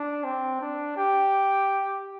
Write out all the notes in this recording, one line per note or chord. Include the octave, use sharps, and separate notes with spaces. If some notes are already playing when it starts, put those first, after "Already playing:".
Already playing: D4
C4
D4
G4